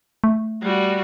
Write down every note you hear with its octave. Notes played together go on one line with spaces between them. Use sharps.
A3
G3 F#4